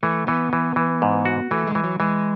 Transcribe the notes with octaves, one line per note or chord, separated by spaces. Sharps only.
E3 A3
E3 B3
E3
E3
G#2
F#4
E3 A3
G#3
E3
F#3
E3 G#3